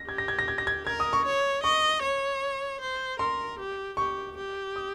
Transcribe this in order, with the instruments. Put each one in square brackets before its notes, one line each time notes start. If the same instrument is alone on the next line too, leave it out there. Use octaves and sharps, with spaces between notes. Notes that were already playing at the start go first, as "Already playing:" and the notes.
Already playing: [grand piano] A#6
[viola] G4 [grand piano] G#6
[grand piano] A#6
G#6
A#6
G#6
A#6
G#6
[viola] A#4 [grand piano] G#6
[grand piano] D#6
C#6
[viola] C#5
[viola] D#5 [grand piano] C#6
[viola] C#5
C5
[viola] A#4 [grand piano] C6
[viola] G4
[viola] G4 [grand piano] C#6
[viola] G4
[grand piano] D#6